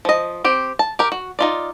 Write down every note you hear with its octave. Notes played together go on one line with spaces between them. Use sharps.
F3 D#5
C4 G4
A5
G4 A#4
F#4
D#4 F4 D5